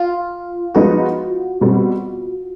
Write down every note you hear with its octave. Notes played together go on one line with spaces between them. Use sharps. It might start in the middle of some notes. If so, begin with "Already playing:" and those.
Already playing: F4
F3 G#3 B3 D#4 F#4
B2 G3 C4